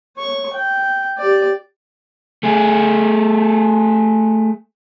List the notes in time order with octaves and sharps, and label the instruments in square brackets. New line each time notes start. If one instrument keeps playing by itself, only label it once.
[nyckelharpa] C#5 C#6
G5
G4 D5
[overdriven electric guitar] A3 G#4